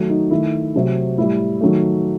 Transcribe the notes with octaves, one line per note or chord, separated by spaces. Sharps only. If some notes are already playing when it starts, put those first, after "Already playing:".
Already playing: D#3 F#3 A3
D#4
D#3 A3 E4
C3 F#3 A3
A2 G3 E4
D#3 F#3 A3